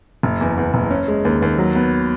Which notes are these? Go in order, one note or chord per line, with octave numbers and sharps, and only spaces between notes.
F#1
E2
E2
F#1
C#4
G#3
D#2
D#2
F#3
B3